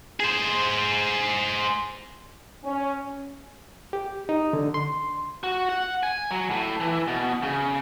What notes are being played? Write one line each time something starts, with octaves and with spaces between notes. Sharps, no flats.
G#4 C5
C#4
G4
D#4
D3
C6
F#4
F#5
G#5
F#3
A2
E3
B2
C#3